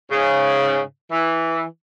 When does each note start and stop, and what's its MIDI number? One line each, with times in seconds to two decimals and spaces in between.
0.12 0.79 44
0.12 0.79 49
1.12 1.62 52